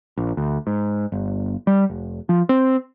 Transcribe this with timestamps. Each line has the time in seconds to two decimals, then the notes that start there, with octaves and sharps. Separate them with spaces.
0.17 A#1
0.37 D2
0.67 G#2
1.12 G1
1.67 G3
1.90 F1
2.29 F3
2.49 C4